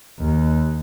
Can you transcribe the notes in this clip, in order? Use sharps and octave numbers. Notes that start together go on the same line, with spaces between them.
D#2